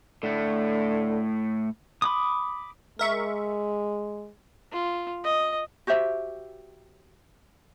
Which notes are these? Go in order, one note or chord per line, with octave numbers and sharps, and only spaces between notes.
A2 D3 A3
B5 D6 D#6
G#3 A#4 E5 C#6
F4
D#5
F#4 G4 C5 E5